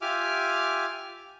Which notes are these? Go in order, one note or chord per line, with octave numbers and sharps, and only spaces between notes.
F4 G4 E5 G#5 D6 F6